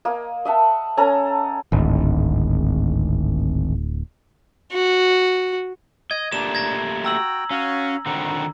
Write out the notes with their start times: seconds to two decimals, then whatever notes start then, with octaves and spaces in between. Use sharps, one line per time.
0.05 A#3 D#5
0.45 D#5 E5 F#5 A5
0.97 C#4 A4 G#5 A#5
1.72 D1 G#1
4.73 F#4
6.11 D#5 G#6
6.32 A3 A#3 D4 G4 D5 E7
6.55 G#6 A#6
7.05 F#4 G5 A#5 E6 F#7
7.50 C#4 F#4 F5
8.06 D3 D#3 C4 F#5